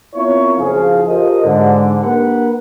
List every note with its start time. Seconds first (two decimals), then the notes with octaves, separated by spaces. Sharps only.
0.15 B3 C4 E4 F4 A#4 C#5
0.58 F#1 F3 G#4 F5
1.08 F4 G4 A4 A#4 C5 D#5
1.44 G#2 D3
2.01 A#3 D4 G4 A#4 B4 F#5